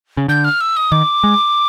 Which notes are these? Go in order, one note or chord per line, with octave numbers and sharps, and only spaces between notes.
C#3
D3 G6
F6
E6
D#6
D#3 D6
G#3